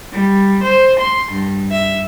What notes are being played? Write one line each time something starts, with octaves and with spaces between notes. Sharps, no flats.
G3
C5
C6
G2
E5